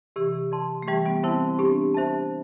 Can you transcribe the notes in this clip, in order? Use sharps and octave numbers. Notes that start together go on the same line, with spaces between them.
C3 E3 G4
D5 A5 C6
A3
E3 G3 G4
G3 B3
C4 E4 C5 E5 A5
C4
B3 D4 G4
C5 E5 A5